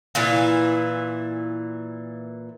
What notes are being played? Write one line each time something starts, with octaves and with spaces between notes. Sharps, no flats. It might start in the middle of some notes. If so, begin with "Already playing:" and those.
A#2 E3 E4